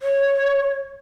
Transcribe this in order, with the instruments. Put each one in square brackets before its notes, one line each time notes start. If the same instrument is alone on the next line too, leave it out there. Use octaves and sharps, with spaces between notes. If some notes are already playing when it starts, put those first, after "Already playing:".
[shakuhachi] C#5